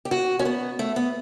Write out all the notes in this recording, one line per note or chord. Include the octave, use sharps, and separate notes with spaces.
G4
F#4
C#4
B3
A3
B3